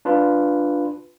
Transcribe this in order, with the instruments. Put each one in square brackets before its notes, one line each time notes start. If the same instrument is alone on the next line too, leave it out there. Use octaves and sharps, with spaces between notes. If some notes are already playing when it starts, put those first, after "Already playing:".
[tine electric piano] D4 F4 B4